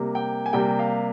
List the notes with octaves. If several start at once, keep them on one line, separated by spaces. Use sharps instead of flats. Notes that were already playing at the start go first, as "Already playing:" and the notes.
Already playing: C3 G3 A#3
G5
G#5
C3 G3 A#3 G5
F5